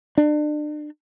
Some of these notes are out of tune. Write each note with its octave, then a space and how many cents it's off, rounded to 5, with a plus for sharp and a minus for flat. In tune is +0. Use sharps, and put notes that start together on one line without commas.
D4 +35